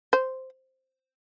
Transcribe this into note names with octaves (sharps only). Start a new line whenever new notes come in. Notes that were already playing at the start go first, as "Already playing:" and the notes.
C5